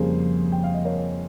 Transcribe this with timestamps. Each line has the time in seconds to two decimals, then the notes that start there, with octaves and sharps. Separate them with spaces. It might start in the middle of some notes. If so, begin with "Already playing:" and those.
Already playing: F2 C#3 G3 A#3 G#4 C5
0.52 G5
0.64 F5
0.74 D#5
0.85 A#4 C#5